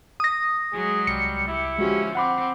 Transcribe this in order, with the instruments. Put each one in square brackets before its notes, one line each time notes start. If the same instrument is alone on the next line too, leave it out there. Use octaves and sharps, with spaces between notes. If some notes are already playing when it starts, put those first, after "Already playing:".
[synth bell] D#6 A#6
[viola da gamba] F#3 G#3 [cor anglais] G#4
[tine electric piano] C2 [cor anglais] G3 [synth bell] C#7
[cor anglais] E4 [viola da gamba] G4
[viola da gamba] D3 F3 C#4 [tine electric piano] G#3 F#4 G4
[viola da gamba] C4 [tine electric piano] F#5 B5 D6